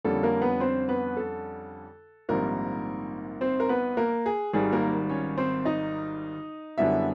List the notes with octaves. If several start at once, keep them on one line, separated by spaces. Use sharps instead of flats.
F2 D3 G3 A#3 C#4 A4
A#3 A#4
B3 B4
C4 C5
B3 B4
A4
A#1 G#2 D#3 G3 A#3 C4 A#4
C4 C5
A#4
B3 B4
A#3 A#4
G#4
G#1 G#2 D#3 G3 G#4
A#3 A#4
C#4 C#5
C4 C5
D#4 D#5
F#2 D3 G3 B3 E4 E5